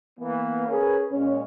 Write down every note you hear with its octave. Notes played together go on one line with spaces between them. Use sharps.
E3 A#3 B3
C#4 G#4 A#4 B4
A#2 G#3 C#4